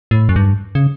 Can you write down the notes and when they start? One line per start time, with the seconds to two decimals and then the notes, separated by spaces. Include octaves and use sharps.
0.11 A2
0.29 F#2
0.36 G2
0.75 C#3